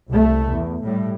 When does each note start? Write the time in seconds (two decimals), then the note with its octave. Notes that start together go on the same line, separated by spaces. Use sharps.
0.10 C2 A3
0.51 E2
0.83 A2 G3